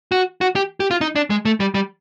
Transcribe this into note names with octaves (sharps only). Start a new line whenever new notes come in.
F#4
F#4
G4
G4
F4
D#4
D4
G#3
A3
G3
G3